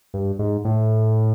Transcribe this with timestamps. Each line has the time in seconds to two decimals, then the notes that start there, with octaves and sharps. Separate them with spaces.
0.14 G2
0.39 G#2
0.65 A2